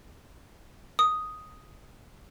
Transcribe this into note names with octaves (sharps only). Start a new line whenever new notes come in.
D#6